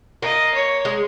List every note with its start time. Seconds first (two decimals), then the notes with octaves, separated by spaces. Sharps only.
0.22 A#3 D#5
0.54 C#5
0.85 G#3